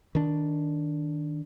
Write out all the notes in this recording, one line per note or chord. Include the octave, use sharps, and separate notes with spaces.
D#3 D4